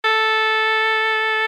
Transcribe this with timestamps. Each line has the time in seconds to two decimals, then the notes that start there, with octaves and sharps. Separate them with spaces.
0.05 A4